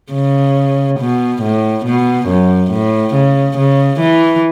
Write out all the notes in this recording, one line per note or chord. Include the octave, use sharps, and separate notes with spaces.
C#3
B2
A2
B2
F#2
A2
C#3
C#3
E3